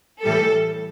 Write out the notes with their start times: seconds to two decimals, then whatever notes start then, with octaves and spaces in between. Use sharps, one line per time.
0.24 A2 E3 G3 A4